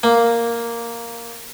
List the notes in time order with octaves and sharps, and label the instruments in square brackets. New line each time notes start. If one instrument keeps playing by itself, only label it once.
[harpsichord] A#3